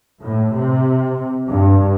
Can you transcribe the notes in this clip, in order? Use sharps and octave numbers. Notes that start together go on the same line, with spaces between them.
A2
C3
G2